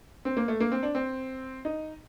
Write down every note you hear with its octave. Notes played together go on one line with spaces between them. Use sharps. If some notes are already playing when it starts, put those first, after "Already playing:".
C4
A#3
A3
A#3
C4
D4
C4
D#4